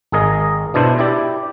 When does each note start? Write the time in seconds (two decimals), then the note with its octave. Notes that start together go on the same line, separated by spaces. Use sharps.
0.12 G#1 G#4 A#4 D#5
0.74 B2 D4 E4 C5
0.99 E4 G4 D5